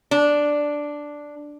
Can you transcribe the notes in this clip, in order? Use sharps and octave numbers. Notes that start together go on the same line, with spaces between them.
D4